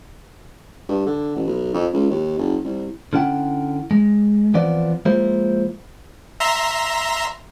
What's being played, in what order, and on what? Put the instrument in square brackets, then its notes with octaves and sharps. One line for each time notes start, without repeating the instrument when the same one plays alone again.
[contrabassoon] G2
D3
A1
B1
F2
C#2
D#2
F#1
C2
[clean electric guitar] D3 C#4 E4 F#5 G5
G#3
E3 F3 B3 C4 F4 D5
F3 G#3 A#3 E4 F4 C5
[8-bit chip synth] E5 A#5 C6